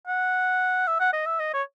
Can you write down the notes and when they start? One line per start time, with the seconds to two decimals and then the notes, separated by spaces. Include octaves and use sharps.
0.08 F#5
0.87 E5
1.00 F#5
1.13 D#5
1.26 E5
1.40 D#5
1.54 C#5